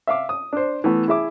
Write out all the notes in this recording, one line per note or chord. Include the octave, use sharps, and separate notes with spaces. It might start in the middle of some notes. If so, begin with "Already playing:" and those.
E5 F5 D6
D#6
D4 C5
E3 A3 B3
E4 G#4 E5 D6